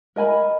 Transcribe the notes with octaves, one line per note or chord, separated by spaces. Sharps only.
A#4 D#5 G#5 B5